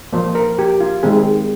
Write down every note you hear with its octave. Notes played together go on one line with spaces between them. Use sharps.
F3 A#3 C5
A#4
G4
F4
D#3 G#3 C4 G#4